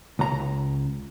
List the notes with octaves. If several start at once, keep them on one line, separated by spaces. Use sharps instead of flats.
C#2 A#5